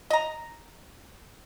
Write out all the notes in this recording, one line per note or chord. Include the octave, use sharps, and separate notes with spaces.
D#5 A#5